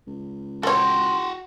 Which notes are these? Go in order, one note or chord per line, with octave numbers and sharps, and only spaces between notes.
C#2
F#4 A4 C#5 G5 C6